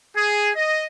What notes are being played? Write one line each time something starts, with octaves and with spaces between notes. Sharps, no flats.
G#4
D#5